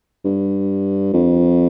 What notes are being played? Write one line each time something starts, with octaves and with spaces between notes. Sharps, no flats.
G2
F2